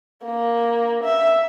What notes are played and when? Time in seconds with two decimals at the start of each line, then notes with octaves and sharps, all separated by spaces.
0.24 A#3
1.04 E5